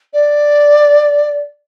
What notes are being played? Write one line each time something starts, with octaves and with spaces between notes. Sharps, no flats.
D5